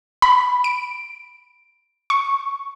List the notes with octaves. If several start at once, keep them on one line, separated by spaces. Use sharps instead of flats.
B5
D7
C#6